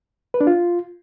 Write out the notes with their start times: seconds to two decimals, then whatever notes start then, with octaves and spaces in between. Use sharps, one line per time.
0.34 B4
0.41 D4
0.47 F4